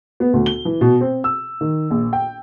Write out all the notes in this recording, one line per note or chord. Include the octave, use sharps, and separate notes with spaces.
B3
D2
G7
E3
B2
C4
E6
D#3
A#1
G5